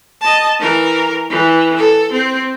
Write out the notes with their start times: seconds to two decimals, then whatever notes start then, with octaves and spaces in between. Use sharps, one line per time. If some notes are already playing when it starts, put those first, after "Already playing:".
0.21 D#5 A5
0.60 E3 A#4
1.30 E3
1.77 A4
2.12 C4